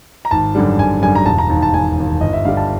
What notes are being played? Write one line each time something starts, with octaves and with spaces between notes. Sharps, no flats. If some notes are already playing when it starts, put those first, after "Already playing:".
A#5
G#1 A5
F#2 D3 G3
G#1 G#5
F#2 D3 G3 G#5
A#5
E1 A5
A#5
D#2 D#3 A5
A5
E1 G#5
D#2 D#3
G1 D#5
E5
G2 D3 G3 F5
A5